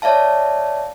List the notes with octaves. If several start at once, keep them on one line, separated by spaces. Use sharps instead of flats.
C#5 D5 E5 F5 A5